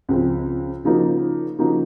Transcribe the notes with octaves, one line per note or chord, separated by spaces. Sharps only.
C#2 C#3 F3 C4 F4
C#3 F3 A#3 D#4 F#4
C#3 F3 A#3 D#4 F#4